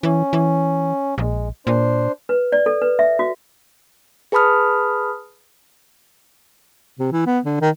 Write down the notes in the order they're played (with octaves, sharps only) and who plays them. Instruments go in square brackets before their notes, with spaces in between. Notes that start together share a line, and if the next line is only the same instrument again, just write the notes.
[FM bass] E3 [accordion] C#4
[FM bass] E3
[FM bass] A#1 [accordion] G#3
[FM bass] A#2 [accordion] D4 C5
[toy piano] B4
D5
A4
B4
E5
F#4
[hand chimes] G#4 B4 A5 B5 D#6 F6
[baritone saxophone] C3
E3
B3
D3
D#3